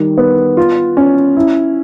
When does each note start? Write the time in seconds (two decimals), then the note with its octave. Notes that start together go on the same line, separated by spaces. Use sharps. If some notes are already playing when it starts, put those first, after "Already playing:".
Already playing: D#3 G3
0.18 B3
0.57 F4
0.97 C#4
1.36 E4